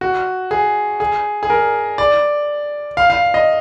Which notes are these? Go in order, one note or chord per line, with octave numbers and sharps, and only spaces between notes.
F#4
G#4
G#4
G#4
A#4
D5
F5
F5
D#5